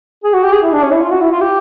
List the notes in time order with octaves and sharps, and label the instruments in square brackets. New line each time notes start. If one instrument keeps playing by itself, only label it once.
[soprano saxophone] G#4
F#4
G4
G#4
E4
D4
C#4
E4
F4
F#4
E4
F4
G4